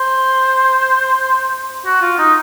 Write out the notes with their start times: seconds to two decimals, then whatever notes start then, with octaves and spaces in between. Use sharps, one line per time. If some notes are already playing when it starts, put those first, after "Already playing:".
Already playing: C5
1.86 F#4
2.02 F4
2.18 D#4